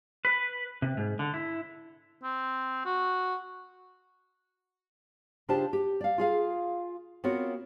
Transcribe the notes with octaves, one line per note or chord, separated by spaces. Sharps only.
B4
C3
G#2
D3
E4
C4
F#4
C#3 D4 F4 G4 C5 A5
G4
D5 F5
F4 G#4 F5
B3 C4 F4 F#4 A#4 C#5